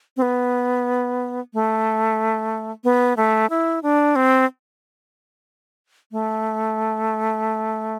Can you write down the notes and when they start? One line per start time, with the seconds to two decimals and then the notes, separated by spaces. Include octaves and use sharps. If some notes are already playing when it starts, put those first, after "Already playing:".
0.17 C4
0.22 B3
1.54 A3
2.84 B3
3.17 A3
3.50 E4
3.83 D4
4.16 C4
6.12 A3